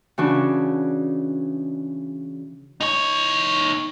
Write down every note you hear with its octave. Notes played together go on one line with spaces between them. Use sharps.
C#3 E3 C#4 D4 F#4
D#4 C#5